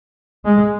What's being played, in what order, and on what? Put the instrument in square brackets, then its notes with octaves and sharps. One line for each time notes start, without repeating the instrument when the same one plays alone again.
[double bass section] G#3